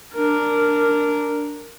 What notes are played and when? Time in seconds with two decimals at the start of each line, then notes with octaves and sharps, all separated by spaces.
0.14 D4 A#4